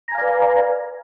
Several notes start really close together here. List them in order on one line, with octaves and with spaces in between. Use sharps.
A#5 G#5 F5 D5 B4